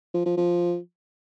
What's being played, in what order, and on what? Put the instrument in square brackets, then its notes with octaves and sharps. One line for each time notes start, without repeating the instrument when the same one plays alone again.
[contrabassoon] F3
F3
F3